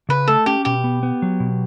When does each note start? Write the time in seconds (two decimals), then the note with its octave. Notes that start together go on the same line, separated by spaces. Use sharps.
0.09 C#3 B4
0.27 A3 A4
0.46 C#4 G4
0.65 B2 G4
0.84 B3
1.03 B3
1.22 F#3
1.40 B2